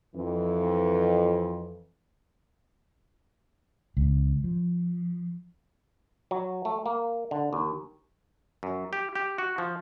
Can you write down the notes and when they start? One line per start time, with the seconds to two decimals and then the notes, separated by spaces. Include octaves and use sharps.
0.15 F2 E3
3.97 C#2
4.44 F3
6.31 F#3
6.65 A3
6.86 A#3
7.31 D3
7.53 D#2
8.63 F#2
8.93 G4
9.15 G4
9.38 F#4
9.58 F3